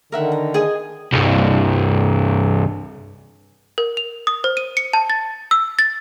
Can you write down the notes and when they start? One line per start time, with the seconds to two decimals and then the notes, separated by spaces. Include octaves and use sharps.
0.12 D3 D#3 A#4 E5 F#5
0.32 A#5
0.54 G#4 D#5 G#5
1.12 C2 G2
3.78 A#4
3.97 F7
4.27 D#6
4.44 C5
4.57 D#7
4.77 C#7
4.93 A5
5.10 A6
5.51 E6
5.79 A6